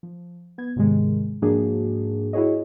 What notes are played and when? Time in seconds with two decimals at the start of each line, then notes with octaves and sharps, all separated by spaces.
0.03 F3
0.58 B3 G#6
0.76 G#2 C3 D#3 G#3
1.42 G#2 F3 A#3 D4 F#4 G#4
2.33 E4 F#4 G#4 C#5 D#5